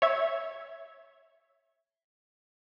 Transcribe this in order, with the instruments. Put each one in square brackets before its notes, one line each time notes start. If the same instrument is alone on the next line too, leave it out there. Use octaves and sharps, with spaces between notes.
[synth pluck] C#5 E5 G#6